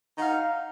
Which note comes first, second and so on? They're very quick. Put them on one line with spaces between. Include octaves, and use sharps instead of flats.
D#4 F#5 F5